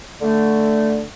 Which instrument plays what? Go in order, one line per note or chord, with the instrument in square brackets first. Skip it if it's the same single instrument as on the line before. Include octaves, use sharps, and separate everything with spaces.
[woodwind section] D3 A3